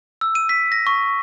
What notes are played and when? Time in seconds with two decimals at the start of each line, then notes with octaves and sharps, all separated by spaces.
0.21 E6
0.35 D#7
0.49 B6
0.72 A#6
0.87 C#6